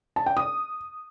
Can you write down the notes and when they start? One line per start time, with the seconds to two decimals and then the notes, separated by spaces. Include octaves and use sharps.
0.16 A5
0.26 G5
0.37 D#6